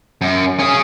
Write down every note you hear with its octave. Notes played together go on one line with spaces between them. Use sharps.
F#2
C#4 G#4